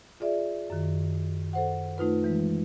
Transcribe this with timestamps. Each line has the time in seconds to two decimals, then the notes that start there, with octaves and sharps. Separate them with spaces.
0.20 F4 G#4 D5 E5
0.70 F#2 D#3
1.53 A4 C5 F#5
1.98 A3 D#4 F4 B4
2.24 E3 G#3